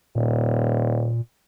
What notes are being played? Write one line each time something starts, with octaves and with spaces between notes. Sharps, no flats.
D#1 A#2